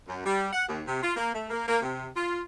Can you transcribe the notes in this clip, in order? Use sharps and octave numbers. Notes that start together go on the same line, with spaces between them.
F#2
G3
F#5
D#2
C3
F4
A#3
A3
A#3
A#3
C3
F4